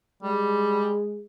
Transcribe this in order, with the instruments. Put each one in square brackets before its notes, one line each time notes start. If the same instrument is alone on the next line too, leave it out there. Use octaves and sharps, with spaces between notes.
[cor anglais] G3 [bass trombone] G#3